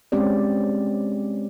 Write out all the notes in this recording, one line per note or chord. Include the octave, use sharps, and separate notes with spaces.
G#3 C4 C#4 G4 D5